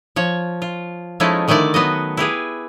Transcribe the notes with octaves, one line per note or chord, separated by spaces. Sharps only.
F3 C#5
F4
F3 G#3 A3 C#4 D#4 E4
D3 D#3 A3 E4 D5
F#3 B3 F#4 D#5
E4 G4 G#4 B4